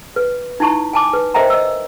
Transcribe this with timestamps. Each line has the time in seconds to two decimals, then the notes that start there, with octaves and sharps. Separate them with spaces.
0.16 B4
0.60 D#4 E4 A5 C#6
0.93 G#5 A5 D6
1.13 B4
1.34 A#4 C5 D#5 E5 G5 A#5
1.50 D#5 E6